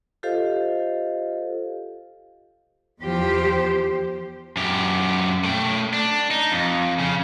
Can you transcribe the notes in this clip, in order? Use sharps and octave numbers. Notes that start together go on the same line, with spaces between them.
F4 G4 A4 C5 D#5 F5
E2 F3 G4 C5
F#2 G4
A3 G5
D4
D#4
F2
C#3